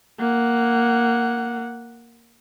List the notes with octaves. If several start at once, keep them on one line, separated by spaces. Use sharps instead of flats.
A#3 F#5